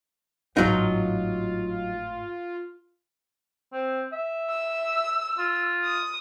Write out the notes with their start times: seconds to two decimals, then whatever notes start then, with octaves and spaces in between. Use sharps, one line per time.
0.57 G#1 A2 F#3 D#4 F4
3.73 C4
4.13 E5
4.50 E6
5.38 F4
5.84 D#6